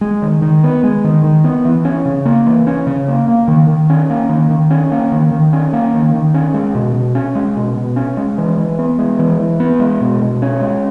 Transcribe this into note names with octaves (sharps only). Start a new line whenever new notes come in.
G#3
D#3
D#3
B3
G#3
D#3
D#3
B3
E3
C#4
C#3
A#3
E3
C#4
C#3
A#3
A#3
D#3
D#3
C#4
A#3
D#3
D#3
C#4
A#3
D#3
D#3
C#4
A#3
D#3
D#3
C#4
G#3
B2
B2
C#4
G#3
B2
B2
C#4
G#3
E3
E3
B3
G#3
E3
E3
B3
G#3
B2
B2
C#4
G#3